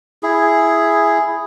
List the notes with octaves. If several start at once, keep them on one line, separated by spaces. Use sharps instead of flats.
E4 G#4